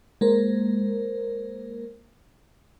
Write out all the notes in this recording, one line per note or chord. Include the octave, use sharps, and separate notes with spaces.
G#3 A#3 A#4 C5